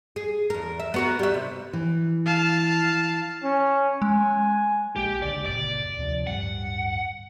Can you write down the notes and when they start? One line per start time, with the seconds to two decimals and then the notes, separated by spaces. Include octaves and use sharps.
0.16 G#4
0.50 E2 A#4
0.80 E5
0.94 B3 F#4 A#4
1.19 G3 E5
1.34 C3
1.73 E3
2.26 F5 A5
3.44 C#4
4.02 G#3 G#5
4.96 A#1 G#3 A#3 G4
5.22 C#2 D3 D5
5.46 F#1 C#2 A#2 D5
5.98 D2 C3 F3
6.27 D1 G2 G3 F#5